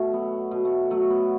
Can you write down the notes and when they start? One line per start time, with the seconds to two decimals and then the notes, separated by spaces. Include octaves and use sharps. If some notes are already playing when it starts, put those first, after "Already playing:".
Already playing: B2 A3
0.12 F#3 B3
0.51 B2
0.65 A3
0.91 F#3 A3
1.10 B3